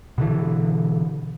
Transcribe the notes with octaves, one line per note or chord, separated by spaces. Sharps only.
B2 D3 E3